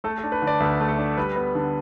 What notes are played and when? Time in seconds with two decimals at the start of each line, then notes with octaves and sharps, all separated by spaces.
0.04 A3 A4
0.18 A4
0.24 D4
0.32 B4
0.42 D3
0.47 D5
0.60 D2 B4
0.80 A3
0.88 A4
0.98 D4
1.17 G3 B4
1.36 B3
1.55 D3